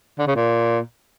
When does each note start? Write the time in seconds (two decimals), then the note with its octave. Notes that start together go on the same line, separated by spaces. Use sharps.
0.19 D3
0.27 C#3
0.36 A#2